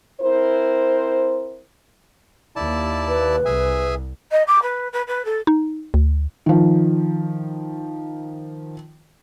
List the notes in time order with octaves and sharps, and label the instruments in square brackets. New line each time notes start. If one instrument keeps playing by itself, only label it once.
[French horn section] C4 E4 A#4 C5
[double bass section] D#2 [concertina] E4 D5 A5
[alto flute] B4
[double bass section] C2 [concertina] G#4 E5 G#5
[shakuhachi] D#5
D6
B4
B4
B4
A4
[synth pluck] D#4
D2
[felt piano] D#3 F3